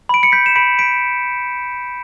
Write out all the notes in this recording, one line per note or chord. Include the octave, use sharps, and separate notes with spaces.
B5 D7
C#7
G6 B6
E7
B5 B6 D7
B6 D7